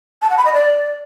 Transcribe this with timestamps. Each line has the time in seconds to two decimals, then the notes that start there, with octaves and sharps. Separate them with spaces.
0.22 A5
0.30 F#5
0.37 B5
0.45 D#5
0.53 D5